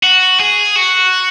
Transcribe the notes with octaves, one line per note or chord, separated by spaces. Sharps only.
F#4
G#4
F#4